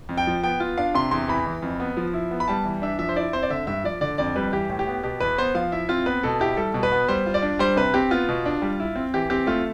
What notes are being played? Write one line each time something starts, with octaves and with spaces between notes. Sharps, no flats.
F2
G5
F3
B3 G5
F4
D4 F5
C3 C6
E2 C6
E3 B5
E3
F2
B3
F3
E4
B3
B5
G3 A5
E3
D4 E5
F3 E5
C5
E4 D5
C4 C5
D5
D3 E5
G2 E5
F3 D5
D3 D5
F2 D5
G3 B4
E3 G4
A2
G4
B3
B2 G4
E2 B4
B3 C5
F3 F5
E4 E5
C4 F4
B3 B4
B2 A4
E4 G4
G3 A4
B2
B4
B3
G3 C5
F4
D5
D4
G3 C5
C3 B4
C4 G4
B3 F4
B2
D4
G3
E4
C4
E3 G4
C4 G4
A3 F4